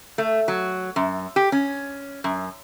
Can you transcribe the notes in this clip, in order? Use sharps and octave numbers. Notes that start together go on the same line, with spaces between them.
A3
F#3
F#2
G4
C#4
F#2